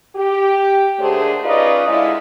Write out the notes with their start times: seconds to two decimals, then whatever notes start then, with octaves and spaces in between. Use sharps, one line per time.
0.16 G4
1.00 D#2 D3 A3 D4 G#4 C5
1.44 C#4 D#4 F4 B4 D5 D#5
1.87 D3 G#3 E4 F4